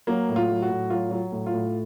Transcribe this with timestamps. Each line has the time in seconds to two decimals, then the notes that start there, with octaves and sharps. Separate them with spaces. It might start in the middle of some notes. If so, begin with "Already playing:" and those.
0.07 F#3 A#3
0.29 A2
0.36 F4
0.49 F#3
0.63 F#4
0.70 A2
0.90 F#3 F4
1.11 F#3
1.32 A2
1.47 F4
1.54 A2